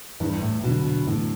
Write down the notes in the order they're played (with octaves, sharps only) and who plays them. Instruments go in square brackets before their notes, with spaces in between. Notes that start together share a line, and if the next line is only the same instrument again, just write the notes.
[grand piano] E2 [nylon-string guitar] G2
[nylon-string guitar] A2
[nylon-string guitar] B2 [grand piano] D3 F#3
[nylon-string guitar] B2
[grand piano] E2 [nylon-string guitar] A2